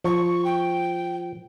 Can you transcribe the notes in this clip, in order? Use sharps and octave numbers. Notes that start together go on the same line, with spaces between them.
F3 C#6
G5